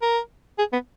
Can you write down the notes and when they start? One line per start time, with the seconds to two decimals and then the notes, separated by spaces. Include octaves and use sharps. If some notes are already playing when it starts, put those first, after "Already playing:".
0.02 A#4
0.58 G#4
0.73 B3